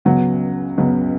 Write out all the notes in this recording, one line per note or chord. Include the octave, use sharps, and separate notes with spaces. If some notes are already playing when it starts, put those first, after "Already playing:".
C#2 C#3 F#3 B3 F#5
C#2 C#3 F#3 B3